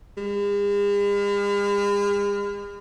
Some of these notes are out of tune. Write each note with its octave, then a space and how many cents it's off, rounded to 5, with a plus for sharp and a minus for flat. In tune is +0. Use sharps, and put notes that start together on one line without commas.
G#3 -45